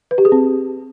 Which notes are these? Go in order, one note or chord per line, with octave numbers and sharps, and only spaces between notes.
B4
G4
G#4
C4